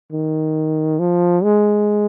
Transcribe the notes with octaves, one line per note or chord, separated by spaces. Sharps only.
D#3
F3
G#3